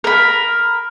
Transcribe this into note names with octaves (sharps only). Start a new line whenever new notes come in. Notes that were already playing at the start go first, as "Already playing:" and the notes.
A#4 B5